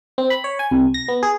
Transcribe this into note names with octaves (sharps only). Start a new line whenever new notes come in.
C4
B5
C#5
G#5
C2
A#6
B3
G#4